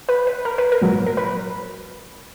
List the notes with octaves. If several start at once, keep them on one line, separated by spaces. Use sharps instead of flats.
B4
B4
A#4
B4
A#4
A#1 G#2 F#3
A#4
B4